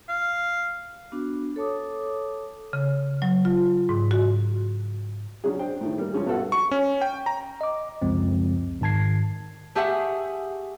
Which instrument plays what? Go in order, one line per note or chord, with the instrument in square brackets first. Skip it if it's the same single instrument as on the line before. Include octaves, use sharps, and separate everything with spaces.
[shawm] F5
[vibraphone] B3 D4 F#4
A4 C#5 A5 D6 D#6
[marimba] C#3
F#3
F4
G#2
F#4
[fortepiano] C#3 F#3 C#4 D4 G#4
D4 C5 G5
A2 D#3
G3 A#3
C#2 F3 C#4 G#4
G2 B2 F#4 A4 F#5
[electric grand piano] C#6
C#4
G5
A#5
[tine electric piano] D#5 D6
C#2 F#2 C#3 F3 G#3 C4
G#2 D#3 A5 G#6 C7
[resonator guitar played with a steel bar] A3 G4 G#4 E5 F#5